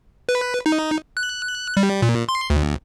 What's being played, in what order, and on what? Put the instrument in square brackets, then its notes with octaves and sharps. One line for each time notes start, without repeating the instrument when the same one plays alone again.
[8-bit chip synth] B4
D#4
F#6
G3
A#2
C6
D2